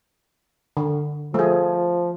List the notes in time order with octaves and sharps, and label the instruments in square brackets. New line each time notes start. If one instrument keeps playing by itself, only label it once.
[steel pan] D3
[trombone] F3 [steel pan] A3 G#4